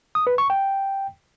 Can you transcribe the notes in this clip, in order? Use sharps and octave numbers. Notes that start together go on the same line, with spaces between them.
D#6
B4
C#6
G5